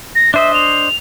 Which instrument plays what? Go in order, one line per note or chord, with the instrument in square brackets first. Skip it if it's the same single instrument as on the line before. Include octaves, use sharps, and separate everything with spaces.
[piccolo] A#6
[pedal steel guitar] D4 C5 D#5 [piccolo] E5
[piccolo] F7